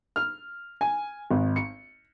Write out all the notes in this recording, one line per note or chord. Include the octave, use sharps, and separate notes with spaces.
F6
G#5
G#1
C#7